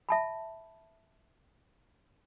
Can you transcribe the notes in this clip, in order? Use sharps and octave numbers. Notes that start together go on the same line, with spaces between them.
E5 A5 B5